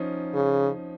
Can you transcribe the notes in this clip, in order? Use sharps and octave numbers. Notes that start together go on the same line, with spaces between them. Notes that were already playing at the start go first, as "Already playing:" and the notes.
Already playing: F3 C#4 D#4
C#3